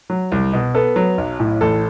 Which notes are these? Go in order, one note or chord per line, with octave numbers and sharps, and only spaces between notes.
F#3
C2
B2
B3 A4
F#3
B1
A2
A1 A4